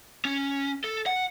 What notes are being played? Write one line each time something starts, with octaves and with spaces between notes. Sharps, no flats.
C#4
A4
F#5